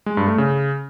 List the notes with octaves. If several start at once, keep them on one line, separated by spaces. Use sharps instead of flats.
G#3
G2
A3
C#3